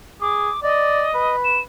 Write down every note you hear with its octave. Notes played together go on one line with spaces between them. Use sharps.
G#4 D6
D5 D#5
B4
E7